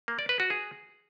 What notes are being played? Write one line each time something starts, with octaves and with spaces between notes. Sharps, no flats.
A#3
D5
B4
F#4
G#4